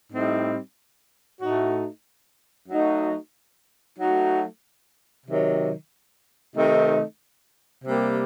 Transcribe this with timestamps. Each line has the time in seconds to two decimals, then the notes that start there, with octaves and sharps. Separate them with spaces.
0.12 A2 G3 C4 D#4
1.40 A2 A3 D#4 F#4
2.69 F#3 A3 D#4 F#4
3.98 F#3 A3 D#4 F#4
5.26 C3 D#3 F#3
6.55 C3 D#3 A3 C4 D#4
7.84 C3 G3 A#3